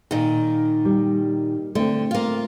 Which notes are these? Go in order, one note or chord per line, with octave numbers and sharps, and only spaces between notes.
A#2 D#3
G3
D3 A3 C4
A#3 F4